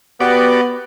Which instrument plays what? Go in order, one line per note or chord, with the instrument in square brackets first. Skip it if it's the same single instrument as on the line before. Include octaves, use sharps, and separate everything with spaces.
[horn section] B3 [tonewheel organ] F#4 G4 D5